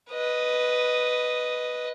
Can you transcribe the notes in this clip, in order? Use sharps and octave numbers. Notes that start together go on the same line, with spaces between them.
B4 D#5